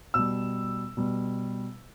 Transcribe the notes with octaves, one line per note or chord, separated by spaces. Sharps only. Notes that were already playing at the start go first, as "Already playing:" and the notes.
B2 G3 E6
B2 G3